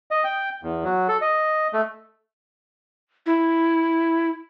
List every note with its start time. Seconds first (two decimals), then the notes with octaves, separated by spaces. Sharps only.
0.11 D#5
0.24 G5
0.63 E2
0.84 F#3
1.08 A4
1.22 D#5
1.73 A3
3.26 E4